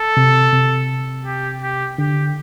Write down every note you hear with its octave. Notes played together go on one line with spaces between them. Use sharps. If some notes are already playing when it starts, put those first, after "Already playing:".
Already playing: A4
C3
C3
G4
G4
D3 G4